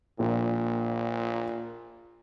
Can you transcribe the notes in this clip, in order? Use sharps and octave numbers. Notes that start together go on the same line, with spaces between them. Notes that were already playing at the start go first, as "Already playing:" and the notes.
A#1 A#2